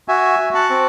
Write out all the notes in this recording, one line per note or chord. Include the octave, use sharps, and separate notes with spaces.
F#4 E5 G#5
F#4
F#5 A5
C4